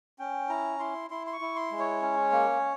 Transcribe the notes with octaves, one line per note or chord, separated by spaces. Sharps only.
C#4 G5
E4 A#5
E4 C6
E4 C6
C6
C#6
E4
C6
G#3
C#5
C#4
A#3